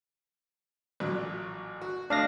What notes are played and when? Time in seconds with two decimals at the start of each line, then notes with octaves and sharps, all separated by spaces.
1.00 A1 A#2 F#3
1.81 F#4
2.10 A3 D4 D#5 F5 A#6